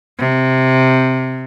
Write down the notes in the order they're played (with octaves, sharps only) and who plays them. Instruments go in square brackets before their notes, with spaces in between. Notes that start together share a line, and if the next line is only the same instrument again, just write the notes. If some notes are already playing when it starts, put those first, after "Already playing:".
[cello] C3